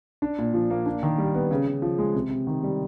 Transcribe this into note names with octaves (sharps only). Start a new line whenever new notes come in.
D4
A#2
F3
A#3
D4
D#3
G3
B3
C#3
C#3
F3
G#3
C3
C3
D#3
G3